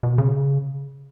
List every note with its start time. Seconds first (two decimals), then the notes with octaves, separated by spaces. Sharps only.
0.03 B2
0.18 C#3